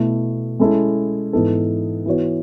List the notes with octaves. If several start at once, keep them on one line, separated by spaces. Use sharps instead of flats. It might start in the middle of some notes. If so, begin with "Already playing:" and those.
Already playing: B2 A3 E4
G#3 C#4 E4 A4
G#2 E3 B3 D#4 A4
E3 B3 F#4 C#5